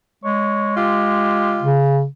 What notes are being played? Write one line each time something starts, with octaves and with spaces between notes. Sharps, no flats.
G#3 C#5
F4 G4
C#3